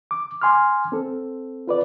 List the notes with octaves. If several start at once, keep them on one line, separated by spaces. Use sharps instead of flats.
D6
G#5 C6 D6 F6
C4 A4
F4 B4 D5